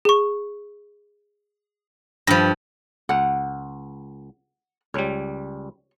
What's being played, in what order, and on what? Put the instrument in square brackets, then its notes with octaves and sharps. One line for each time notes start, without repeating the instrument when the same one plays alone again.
[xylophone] G#4 C#6
[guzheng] G2 F3 [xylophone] A#6
[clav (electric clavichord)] C#2 [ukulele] F#5
[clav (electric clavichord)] C#2 G3 [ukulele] C#5